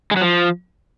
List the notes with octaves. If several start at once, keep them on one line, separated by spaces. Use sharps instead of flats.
G#3
F#3
F3